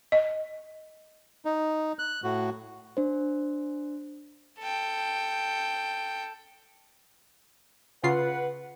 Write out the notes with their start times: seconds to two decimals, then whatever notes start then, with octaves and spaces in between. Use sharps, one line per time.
0.12 D#5
1.45 D#4
1.99 F#6
2.24 A2 F#4
2.97 D4 C5
4.59 A4 G5
8.04 C#3 F4 B4 F#5 C7